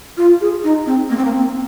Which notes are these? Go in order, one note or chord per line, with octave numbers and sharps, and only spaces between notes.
F4
G#4
D#4
C4
A#3
C4
A#3
C4